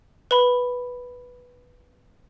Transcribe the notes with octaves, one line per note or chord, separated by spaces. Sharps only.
B4 B5